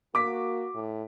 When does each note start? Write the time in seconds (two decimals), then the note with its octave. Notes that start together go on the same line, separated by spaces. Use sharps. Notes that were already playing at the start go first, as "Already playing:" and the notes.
0.15 A#3 F#4 D6 B6
0.74 A2